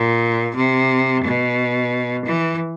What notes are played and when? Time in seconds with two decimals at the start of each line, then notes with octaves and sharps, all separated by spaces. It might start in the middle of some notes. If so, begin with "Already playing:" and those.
Already playing: A#2
0.56 C3
1.24 B2
2.26 E3